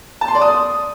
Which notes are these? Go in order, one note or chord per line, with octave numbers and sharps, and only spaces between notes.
A5
C6
D5
D#6